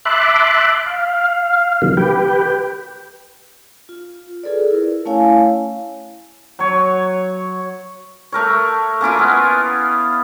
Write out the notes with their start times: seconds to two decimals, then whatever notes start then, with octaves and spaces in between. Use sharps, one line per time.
0.05 E5 A5 B5 C6 D6 F#6
0.86 F5
1.82 C3 D#3 E3 F#3 G3 A#3
1.97 G4 B4 G5
3.89 F4
4.43 F4 G#4 A4 B4 D5
4.71 E4 A#4
5.05 A3 C#4 E4 C#5 F5 G#5
6.59 F#3 C#5
8.32 A3 A#4 C#5
9.01 A#3 C#4 E4 F4
9.19 B3